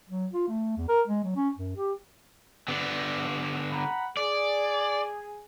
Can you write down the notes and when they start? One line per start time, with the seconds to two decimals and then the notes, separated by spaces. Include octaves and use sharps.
0.10 F#3
0.33 F4
0.49 A3
0.77 E2
0.89 A#4
1.07 G#3
1.24 F#3
1.36 C#4
1.57 F#2
1.77 G4
2.68 D3 B3
3.72 F#5 A#5 B5
4.17 G#4 D5